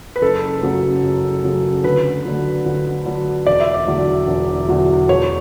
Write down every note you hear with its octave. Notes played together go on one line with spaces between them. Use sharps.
B4
F#1 A4
F#2 C#3 F#3
F#1
F#2 C#3 F#3
D2 B4
D3 F#3
D2
D3 F#3
E1 D5
E5
D5
E2 D3 F#3
E1
E2 D3 F#3
E1 C#5